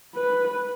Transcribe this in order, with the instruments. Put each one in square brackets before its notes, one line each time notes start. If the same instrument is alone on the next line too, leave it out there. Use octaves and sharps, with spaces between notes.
[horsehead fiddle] B4